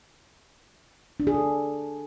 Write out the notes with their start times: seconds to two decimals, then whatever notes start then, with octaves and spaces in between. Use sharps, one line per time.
1.20 D4
1.27 G#4
1.34 A4